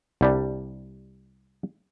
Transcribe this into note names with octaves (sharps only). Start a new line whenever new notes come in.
C2 G3 D4